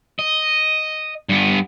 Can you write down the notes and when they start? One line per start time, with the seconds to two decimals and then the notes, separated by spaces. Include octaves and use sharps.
0.19 D#5
1.29 G2 B3